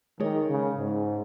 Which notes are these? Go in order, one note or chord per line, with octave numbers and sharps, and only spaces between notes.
D#3 G#3 D#4 G#4 C#5
C#3
G#2